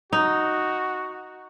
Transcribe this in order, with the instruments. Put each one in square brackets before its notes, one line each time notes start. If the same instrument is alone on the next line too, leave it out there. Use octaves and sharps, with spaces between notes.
[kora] D#4 [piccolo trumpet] F#4